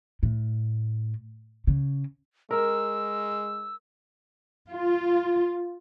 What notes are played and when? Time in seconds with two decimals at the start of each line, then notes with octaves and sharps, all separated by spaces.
0.23 A2
1.67 C#3
2.51 G#3 A#4 E6
4.69 F4